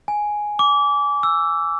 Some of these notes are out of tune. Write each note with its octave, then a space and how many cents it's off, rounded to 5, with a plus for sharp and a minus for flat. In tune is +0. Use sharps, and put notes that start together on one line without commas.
G#5 +5
D6 -25
E6 +10